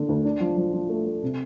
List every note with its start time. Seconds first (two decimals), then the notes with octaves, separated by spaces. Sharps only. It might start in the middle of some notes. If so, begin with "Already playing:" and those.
Already playing: D3 A#3
0.09 D2
0.25 D4
0.40 F3
0.57 F3
0.73 F3
0.89 A3
1.06 A3
1.22 C3